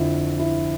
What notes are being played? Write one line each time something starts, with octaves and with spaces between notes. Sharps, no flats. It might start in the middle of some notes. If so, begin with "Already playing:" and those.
Already playing: F2 D3 F3 E4
E4